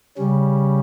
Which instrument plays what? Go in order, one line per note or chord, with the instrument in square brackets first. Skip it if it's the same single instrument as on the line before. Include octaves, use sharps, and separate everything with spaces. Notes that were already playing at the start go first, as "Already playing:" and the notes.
[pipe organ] C#3 G3 C#4